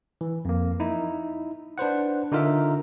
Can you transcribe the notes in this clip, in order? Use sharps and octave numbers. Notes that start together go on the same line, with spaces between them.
E3
F2 A#3
D#4 E4
D4 B4 C5 F#5
D3 D#4 F4 A#4 E5